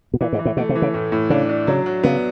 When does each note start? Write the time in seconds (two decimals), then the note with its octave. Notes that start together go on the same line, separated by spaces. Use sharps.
0.14 B2
0.21 A#2 E3
0.33 G#2
0.39 E3
0.45 A2
0.57 B2 A3
0.69 C3
0.75 E3
0.82 C#3
0.94 A2
1.12 A2
1.30 C#3 D4
1.49 D4
1.67 C#3 F#3
1.86 F#3
2.03 C#3 B3